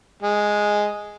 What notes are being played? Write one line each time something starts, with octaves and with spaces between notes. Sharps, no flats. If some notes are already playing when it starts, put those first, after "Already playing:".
G#3